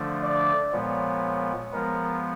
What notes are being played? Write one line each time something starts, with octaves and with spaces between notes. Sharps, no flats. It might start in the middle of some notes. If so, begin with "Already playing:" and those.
Already playing: D3 F3 A3 D4
D5
A#2 F3 G#3 B3 C#5
F3 G#3 B3 A#4